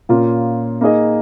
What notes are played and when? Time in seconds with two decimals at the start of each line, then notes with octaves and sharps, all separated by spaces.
0.09 A#2 A#3 C#4 F4
0.81 A#3 D#4 G#4 D#5